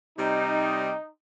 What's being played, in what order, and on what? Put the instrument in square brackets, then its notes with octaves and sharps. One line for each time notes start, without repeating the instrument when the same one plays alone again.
[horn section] C3 G3 [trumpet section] D#4